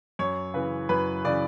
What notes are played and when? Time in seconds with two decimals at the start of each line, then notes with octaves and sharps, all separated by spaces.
0.19 F#2 C#5
0.54 C#3 E3 B4
0.89 F#2 B4
1.25 C#3 E3 D5